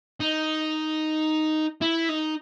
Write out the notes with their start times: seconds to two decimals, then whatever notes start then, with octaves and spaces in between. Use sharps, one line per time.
0.20 D#4
1.81 E4
2.09 D#4